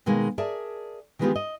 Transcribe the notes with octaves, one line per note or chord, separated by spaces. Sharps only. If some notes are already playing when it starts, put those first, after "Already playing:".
B2 D#3 G#3 A#3
G#4 A#4 D5 E5 A5
D#3 E3 G#3 B3 F4 G4
D#5